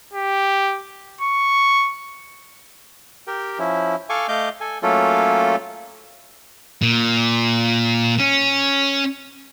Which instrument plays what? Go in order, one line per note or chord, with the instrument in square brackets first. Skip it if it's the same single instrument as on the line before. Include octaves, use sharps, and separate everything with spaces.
[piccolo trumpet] G4
C#6
[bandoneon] G4 A#4 G5
F3 C#4 E4
A4 F5 G#5 C#6 D6
A3 D#5 F5 D6 G6
A4 G#5
F#3 A3 A#3 C#4 F4 A4
[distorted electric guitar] A#2
C#4